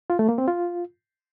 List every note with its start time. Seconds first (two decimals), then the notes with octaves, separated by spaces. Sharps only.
0.10 F4
0.19 A3
0.29 A#3
0.38 C4
0.48 F4